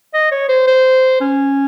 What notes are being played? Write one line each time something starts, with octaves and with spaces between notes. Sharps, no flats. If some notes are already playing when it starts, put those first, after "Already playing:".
D#5
C#5
C5
C5
C#4